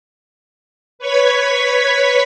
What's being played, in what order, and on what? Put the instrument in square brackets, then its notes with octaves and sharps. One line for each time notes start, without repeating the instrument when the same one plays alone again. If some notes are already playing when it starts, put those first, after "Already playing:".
[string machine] B4 C#5 C#6 G#6 B6